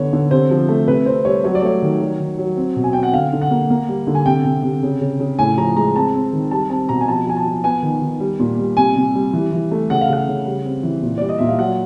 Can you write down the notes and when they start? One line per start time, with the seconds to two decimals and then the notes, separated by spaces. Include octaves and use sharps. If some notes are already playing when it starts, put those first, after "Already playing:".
Already playing: D3 B3 C#5
0.13 D3
0.31 C3 C5
0.51 F3
0.69 A3
0.87 C3 B4
1.06 C4 C5
1.25 G3 C#5
1.44 F#3 C#5
1.55 D5
1.62 A3 C#5
1.82 D#3
2.01 F#3
2.20 D#3
2.38 F#3
2.57 C4
2.76 B2
2.84 G#5
2.93 C4 G5
3.03 F#5
3.13 D3 F5
3.33 D3
3.41 F#5
3.51 A#3
3.70 A#3
3.89 G3
4.07 D3
4.15 G#5
4.26 C3 G5
4.44 C3
4.63 C3
4.83 C#3
5.01 C#3
5.20 C#3
5.39 A2 G#5
5.58 F3 A#5
5.77 G#3 A#5
5.96 C4 A5
6.14 C4
6.33 D#3
6.51 G3 A5
6.70 C4 A5
6.89 B2 A#5
7.01 G#5
7.08 F3 A5
7.27 F3 G#5
7.36 A5
7.45 F3
7.64 B3 G#5
7.82 D#3
8.01 D#3
8.20 G3
8.40 A#2
8.59 G3
8.77 C3 G#5
8.96 C3
9.15 G3
9.33 E3
9.52 E3
9.71 A3
9.90 C#3 F#5
10.01 F5
10.09 C#3 F#5
10.28 C#3
10.46 G3
10.65 C4
10.83 E3
11.03 A#2
11.18 G3 D5
11.29 D#5
11.38 A#2 E5
11.49 F5
11.59 F#3 F#5